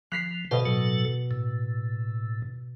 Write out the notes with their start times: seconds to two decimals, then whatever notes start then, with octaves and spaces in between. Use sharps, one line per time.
0.12 F3 F#6 B6 C7
0.51 B2 A4 C5 D#5 F5
0.65 A2 F#3 A4
1.31 A2